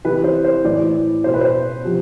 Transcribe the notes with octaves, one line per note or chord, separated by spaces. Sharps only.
C3 E3 B4
C5
C5
A2 E3 D5
B2 C5
B4
C5
C3 F3